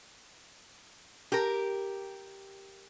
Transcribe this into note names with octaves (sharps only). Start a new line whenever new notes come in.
G4 A#4